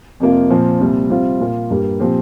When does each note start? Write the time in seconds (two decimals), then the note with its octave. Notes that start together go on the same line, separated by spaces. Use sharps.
0.20 F2 C3 A#3 F4
0.50 A#2 F3 C4
0.80 C2 A#2 G3 C4
1.10 C3 G3 C4 F4
1.40 A#2 A#3 F4
1.70 G2 G3 A#3 G4
2.00 A#2 F3 C4 G4